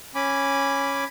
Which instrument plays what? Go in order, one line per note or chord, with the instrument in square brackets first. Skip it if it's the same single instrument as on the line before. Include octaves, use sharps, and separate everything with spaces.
[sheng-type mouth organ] C#4 G#5 B5 D6